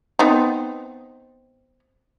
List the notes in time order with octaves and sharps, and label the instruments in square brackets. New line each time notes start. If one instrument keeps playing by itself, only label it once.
[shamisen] B3 C4 D#4